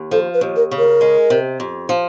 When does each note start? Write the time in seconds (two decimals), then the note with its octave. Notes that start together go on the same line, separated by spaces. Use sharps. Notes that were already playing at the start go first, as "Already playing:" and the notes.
Already playing: D#2
0.11 F3 A4
0.34 B4
0.41 D#2
0.56 A#4
0.71 C#3
0.78 A#4
1.01 G#3
1.30 C3
1.60 F2
1.89 F3